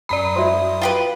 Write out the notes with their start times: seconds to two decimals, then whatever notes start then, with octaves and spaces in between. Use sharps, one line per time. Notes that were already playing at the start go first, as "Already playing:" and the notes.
0.09 F#2 F#3 D5 A#5 B5 D#6
0.35 E4 F#4 C5
0.81 F4 G4 B4